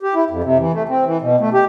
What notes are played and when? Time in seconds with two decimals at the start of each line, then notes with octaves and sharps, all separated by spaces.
0.03 G4
0.15 E4
0.30 F2
0.44 C3
0.59 E3
0.73 A3
0.89 C4
1.06 E3
1.22 B2
1.40 A3
1.54 G4